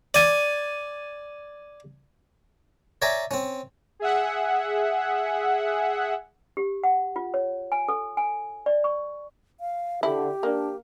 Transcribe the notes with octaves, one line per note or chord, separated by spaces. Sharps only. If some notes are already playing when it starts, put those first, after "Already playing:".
D5 G#5
C#5 D5 E5 G#5 A#5
C4 C#4
G#4 E5 F#5
G4
F#5
F4
C#5
G#5
A4
G#5
D5
C#6
F5
D3 E4 G4
A#3 D4